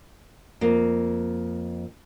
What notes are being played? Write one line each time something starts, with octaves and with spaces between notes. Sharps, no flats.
F2 A#3